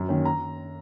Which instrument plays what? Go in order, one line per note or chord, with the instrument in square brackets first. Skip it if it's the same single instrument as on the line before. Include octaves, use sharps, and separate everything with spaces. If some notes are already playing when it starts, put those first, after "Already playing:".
Already playing: [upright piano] F#2
D#3 A#3 C#4
A#5